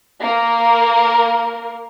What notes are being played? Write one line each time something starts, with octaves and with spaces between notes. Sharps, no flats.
A#3 A#4